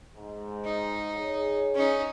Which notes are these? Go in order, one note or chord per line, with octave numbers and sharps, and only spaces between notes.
G#2
D#4
G#4 C#5
C#4 D#4